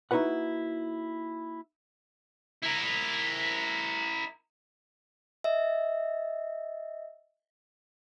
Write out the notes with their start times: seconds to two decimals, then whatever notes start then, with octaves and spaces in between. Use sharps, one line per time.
0.11 A#3 D#4 E4 F#4 B4 F#5
2.63 E4 A#4
5.44 D#5 E5